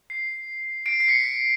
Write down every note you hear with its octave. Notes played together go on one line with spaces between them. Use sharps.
C7
C7 D7
C7
B6 C#7